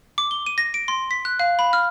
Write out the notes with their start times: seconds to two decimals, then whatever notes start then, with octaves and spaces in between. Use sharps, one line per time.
0.18 D6
0.31 G7
0.46 D#7
0.58 A#6
0.74 D7
0.88 C6
1.11 B6
1.25 F#6
1.39 F5
1.59 B5
1.73 F6